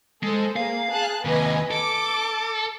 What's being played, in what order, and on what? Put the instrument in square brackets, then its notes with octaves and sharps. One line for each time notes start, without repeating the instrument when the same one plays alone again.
[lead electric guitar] G#3 [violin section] A4 C5
[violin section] A#3 G#4 [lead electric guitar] F5
[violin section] G#4 A5 F#6
[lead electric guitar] D#2 C3 [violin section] B4 D#5 G#5
[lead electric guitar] A4 [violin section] D6